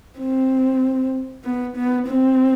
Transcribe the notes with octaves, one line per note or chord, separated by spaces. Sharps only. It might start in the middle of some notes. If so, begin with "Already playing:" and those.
C4
B3
B3
C4